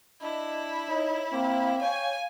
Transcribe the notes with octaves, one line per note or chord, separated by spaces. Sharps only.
D4 E4 D#5
D#4 C#5
A#3 C4 F5
C#5 G5 G#5